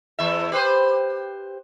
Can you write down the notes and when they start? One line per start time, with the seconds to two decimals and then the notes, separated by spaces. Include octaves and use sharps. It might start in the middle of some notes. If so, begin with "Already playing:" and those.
0.19 E2 E5
0.52 G4 B4 C5